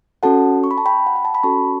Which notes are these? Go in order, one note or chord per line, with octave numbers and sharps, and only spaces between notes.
C#4 F#4 A4 F#5 A5
C#6
B5
A5
G5 B5
F#5
G5
A5
B5
C#4 F#4 A4 A5 C#6